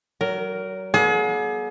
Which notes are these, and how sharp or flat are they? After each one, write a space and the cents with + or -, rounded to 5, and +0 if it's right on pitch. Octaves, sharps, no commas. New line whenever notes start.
F#3 +35 A#4 +0
B3 -40 G#4 +40